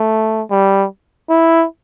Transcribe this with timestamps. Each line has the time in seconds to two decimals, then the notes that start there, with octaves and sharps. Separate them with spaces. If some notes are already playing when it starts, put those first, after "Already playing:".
Already playing: A3
0.50 G3
1.30 E4